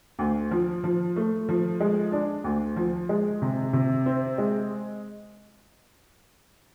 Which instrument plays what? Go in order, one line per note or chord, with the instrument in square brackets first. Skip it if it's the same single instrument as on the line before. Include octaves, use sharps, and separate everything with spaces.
[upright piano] D2
F3
F3
A3
F3
G#3
D4
D2
F3
G#3
C3
C3
C4
G#3